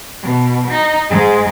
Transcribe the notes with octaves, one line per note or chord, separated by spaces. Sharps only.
B2
D#4
G#2 G#3